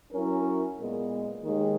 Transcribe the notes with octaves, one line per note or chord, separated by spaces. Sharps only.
F#3 C#4 E4 A#4
A#2 G#3 B3
D#2 D#3 G#3